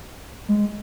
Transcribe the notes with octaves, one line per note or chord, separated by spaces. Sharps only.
G#3